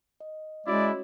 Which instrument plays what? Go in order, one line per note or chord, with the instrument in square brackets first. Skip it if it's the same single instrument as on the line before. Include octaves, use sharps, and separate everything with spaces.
[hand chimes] D#5
[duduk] G#3 [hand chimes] C#4 F#4 C#5 [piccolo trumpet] E4 [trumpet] D5